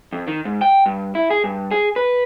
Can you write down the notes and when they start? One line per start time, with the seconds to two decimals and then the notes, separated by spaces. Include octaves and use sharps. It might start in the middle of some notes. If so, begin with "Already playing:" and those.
0.13 F2
0.27 D#3
0.45 G#2
0.61 G5
0.86 G2
1.15 E4
1.31 G#4
1.44 G2
1.71 G#4
1.96 B4